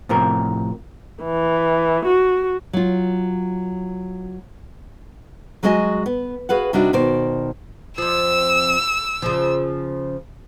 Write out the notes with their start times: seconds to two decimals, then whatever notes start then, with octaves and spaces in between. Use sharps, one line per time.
0.09 A2 C3 F3 A#4
1.23 E3
2.05 F#4
2.73 F#3 F4
5.63 F#3 G#3 F#4 D#5 G#5
6.06 B3
6.49 F#4 G#4 B4 F5 F#5
6.73 C3 G3 D4 D#4 F#4
6.93 B2 D#3 C5 D5
7.98 F2 F3 E6
9.22 C#3 F3